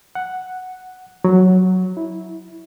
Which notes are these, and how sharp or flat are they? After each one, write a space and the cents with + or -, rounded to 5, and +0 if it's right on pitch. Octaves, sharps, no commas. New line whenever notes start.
F#5 +0
F#3 +0
E4 -15